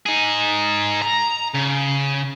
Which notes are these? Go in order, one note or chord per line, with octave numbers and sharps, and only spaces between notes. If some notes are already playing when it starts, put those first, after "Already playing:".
D#4 G#4
A#5
C#3